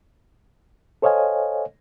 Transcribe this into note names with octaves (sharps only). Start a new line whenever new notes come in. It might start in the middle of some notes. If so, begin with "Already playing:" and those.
A4 C5 C#5 D#5 F5 G#5